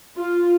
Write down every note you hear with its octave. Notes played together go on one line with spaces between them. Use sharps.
F4